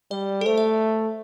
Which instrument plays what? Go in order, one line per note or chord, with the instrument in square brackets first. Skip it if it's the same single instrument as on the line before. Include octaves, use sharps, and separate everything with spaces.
[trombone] G3 [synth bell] D5
[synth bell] A4
[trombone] A3 [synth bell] C5
[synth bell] E5